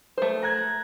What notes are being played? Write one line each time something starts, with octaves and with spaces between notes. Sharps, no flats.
A3 C5
A#5 F#6 G#6